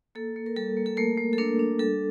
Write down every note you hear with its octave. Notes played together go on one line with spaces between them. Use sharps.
A#3 A4
A#3
A#4
G3 A4
A#3
A4
A3 A#3 A#4
A3
A4
A#3 D4 A#4
D4
G3 A4